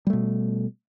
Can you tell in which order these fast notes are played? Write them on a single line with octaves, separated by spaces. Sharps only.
G3 A3 B2